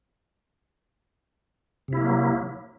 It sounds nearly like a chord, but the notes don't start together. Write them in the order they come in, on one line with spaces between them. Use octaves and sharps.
C3 E4 A#3 F#3